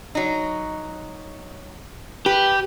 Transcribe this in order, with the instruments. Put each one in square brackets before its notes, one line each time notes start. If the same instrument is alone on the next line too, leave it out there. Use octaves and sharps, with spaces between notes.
[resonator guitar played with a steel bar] F#3 D#4
[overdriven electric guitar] G4 [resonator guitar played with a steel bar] B4